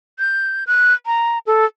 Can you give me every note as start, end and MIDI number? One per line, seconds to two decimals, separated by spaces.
0.19 0.64 91
0.67 0.94 90
1.06 1.38 82
1.46 1.65 69